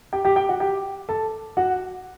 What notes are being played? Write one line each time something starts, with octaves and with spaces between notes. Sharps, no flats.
G4 G5
G4 G5
G4 G5
F#4 F#5
G4 G5
A4 A5
F#4 F#5